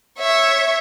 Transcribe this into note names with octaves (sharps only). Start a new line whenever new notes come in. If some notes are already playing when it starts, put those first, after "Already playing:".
C#5 E5